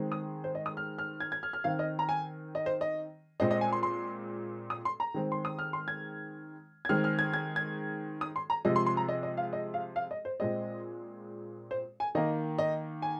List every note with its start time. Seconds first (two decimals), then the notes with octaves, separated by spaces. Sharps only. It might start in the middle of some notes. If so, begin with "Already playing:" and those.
Already playing: D#3 G#3 C4
0.12 D#6
0.44 C5
0.55 D#5
0.66 D#6
0.77 F6
0.98 F6
1.20 G#6
1.32 G#6
1.43 F6
1.53 F6
1.64 D#3 C4 F5
1.79 D#5
1.99 A#5
2.09 G#5
2.55 D#5
2.66 C5
2.81 D#5
3.40 A#2 G#3 C4 D#5
3.51 D#5
3.61 G#5
3.73 C6
3.83 C6
4.70 D#6
4.85 C6
5.00 A#5
5.14 D#3 G#3 C4
5.32 C6
5.45 D#6
5.59 F6
5.73 C6
5.88 G#6
6.85 G#6
6.89 D#3 G#3 C4 F6
7.04 F6
7.19 G#6
7.34 G#6
7.56 G#6
8.21 D#6
8.36 C6
8.50 A#5
8.65 C3 F3 G#3 D#5
8.76 C6
8.86 C6
8.97 A#5
9.09 D#5
9.23 D#5
9.37 F5
9.53 D#5
9.74 F5
9.96 F5
10.11 D#5
10.25 C5
10.40 A#2 G#3 C4 D#5
11.71 C5
12.00 G#5
12.15 D#3 A#3 D#5
12.59 D#5
13.02 G#5